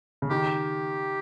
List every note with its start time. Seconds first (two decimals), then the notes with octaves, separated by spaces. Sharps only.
0.22 C#3
0.30 D#3 G4